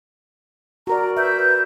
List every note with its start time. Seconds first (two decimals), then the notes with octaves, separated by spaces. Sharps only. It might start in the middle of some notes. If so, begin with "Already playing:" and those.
0.87 F#4 A#4 D5 A#5
1.17 B4 E5 G6